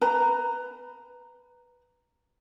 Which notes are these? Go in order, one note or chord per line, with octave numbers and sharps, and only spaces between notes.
B4 A#5